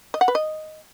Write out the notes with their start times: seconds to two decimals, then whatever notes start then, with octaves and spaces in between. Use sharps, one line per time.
0.14 D#5
0.21 F#5
0.28 B4
0.35 D#5